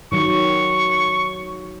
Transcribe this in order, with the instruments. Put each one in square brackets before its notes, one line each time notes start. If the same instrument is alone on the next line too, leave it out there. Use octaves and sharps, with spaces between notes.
[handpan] D#3 F#3 [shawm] C#6